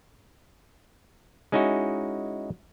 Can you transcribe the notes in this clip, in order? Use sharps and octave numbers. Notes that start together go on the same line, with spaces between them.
G#3 C#4 D#4 E4 F#4